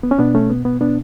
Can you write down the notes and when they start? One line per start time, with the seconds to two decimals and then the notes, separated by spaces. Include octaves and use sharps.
0.03 B3
0.11 C#4
0.19 B2 B3 D4
0.35 A3 C#4
0.50 B3
0.65 B3
0.81 B3 D4